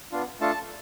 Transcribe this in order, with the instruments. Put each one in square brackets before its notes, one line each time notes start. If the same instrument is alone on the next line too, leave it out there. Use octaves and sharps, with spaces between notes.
[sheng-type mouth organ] B3 D4 F4
A3 D4 F4 A4 A5